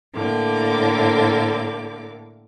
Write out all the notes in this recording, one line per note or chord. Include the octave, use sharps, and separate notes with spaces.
A2 D3 A#3 D6